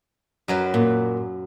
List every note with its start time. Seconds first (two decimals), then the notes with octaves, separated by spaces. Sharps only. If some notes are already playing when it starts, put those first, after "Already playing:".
0.48 F#2 F#3 B4
0.74 A#2